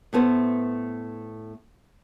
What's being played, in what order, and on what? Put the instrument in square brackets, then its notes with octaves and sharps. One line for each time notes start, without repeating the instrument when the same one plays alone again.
[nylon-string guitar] A2 A3 B3 C5